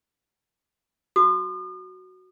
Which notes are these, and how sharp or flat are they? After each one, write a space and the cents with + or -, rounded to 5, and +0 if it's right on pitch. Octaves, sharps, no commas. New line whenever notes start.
F#4 +0 D#6 -45